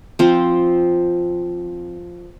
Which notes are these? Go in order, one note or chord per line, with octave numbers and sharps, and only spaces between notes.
F3 C4